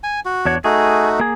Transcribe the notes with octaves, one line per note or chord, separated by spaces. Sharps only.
G#5
F#4
E2 D4 C#5
A3 D#4 F#4 G#4
A#3 G#4